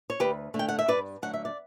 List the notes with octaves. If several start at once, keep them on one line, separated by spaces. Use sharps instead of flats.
C#5
D2 G4 B4
D3 A3
G5
F#5
E5
G2 B4 D5
D3 F#3 A3 F#5
E5
D5